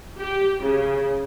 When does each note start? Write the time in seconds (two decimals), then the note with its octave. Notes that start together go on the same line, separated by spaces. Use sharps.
0.20 G4
0.64 C#3